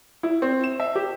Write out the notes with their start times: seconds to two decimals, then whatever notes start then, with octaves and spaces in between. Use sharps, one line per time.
0.23 E4
0.42 C4
0.64 E7
0.80 E5
0.96 G4